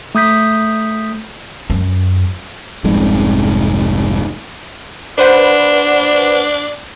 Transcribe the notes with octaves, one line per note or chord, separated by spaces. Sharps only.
A3 D#6 G6 B6
F#2
F1 C2 F2 G#2
D4 B4 C5 F#5